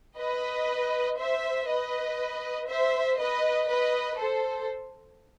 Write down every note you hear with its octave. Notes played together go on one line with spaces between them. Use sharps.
B4 D#5
C5 E5
B4 D#5
C5 E5
B4 D#5
B4 D#5
A4 C5